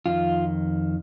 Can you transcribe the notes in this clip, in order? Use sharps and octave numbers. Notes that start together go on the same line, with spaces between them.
F2 D#3 F4